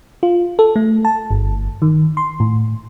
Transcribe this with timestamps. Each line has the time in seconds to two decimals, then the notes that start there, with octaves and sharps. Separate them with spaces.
0.23 F4
0.59 A4
0.76 A3
1.05 A5
1.31 G1
1.82 D#3
2.17 C6
2.40 A2